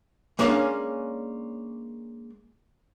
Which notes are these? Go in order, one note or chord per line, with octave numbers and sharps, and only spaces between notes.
G#3 A#3 C#4 D4 C#5 F5